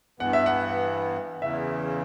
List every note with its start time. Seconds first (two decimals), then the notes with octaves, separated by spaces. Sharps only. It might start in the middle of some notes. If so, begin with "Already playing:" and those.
0.20 G2 E3 B3 F#5
0.33 E5
0.46 F#5
1.42 E2 C#3 E3 E5